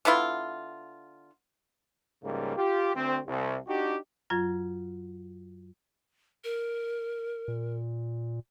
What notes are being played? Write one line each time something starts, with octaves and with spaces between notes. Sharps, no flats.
D3 B3 E4 F4
C#2 G#2 C#3 G3 A#3
F4 G4
D2 C4
C2
D4 D#4 F#4 G4
F#2 F#3 F4 G#6
A#4
A#2